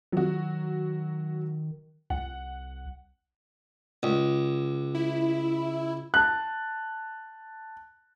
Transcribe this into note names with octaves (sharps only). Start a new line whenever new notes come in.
D#3 F#3 F#4
C2 F#5
C#2
E4
A5 F#6